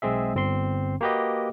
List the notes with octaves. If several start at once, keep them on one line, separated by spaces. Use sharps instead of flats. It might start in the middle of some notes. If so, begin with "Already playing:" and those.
B1 G#3 C4 G#4 E5
G1 C4 C6
A#3 F#4 G4 B4 D#5